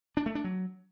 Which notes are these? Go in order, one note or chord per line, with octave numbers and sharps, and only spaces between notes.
D4
A3
D4
F#3